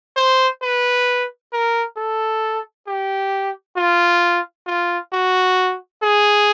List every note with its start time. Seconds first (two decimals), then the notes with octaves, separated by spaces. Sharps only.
0.17 C5
0.62 B4
1.53 A#4
1.97 A4
2.87 G4
3.77 F4
4.67 F4
5.13 F#4
6.03 G#4